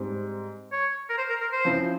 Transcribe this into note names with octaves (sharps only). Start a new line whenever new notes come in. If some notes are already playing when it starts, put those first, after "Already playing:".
Already playing: G#2 G3 C4
C#5
A#4
C5
A#4
A#4
C5
C#3 F3 C4 E4